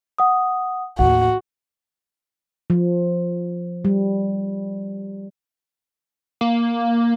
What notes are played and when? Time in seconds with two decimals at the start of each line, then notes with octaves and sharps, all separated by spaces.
0.18 F#5 D#6
0.99 A1 D#2 F#4 F#5
2.70 F3
3.85 G3
6.41 A#3